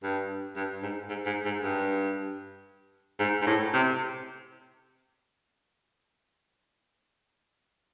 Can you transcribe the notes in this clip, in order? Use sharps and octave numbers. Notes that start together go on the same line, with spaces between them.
G2
G2
G#2
G#2
G#2
G#2
G2
G#2
G#2
A2
C3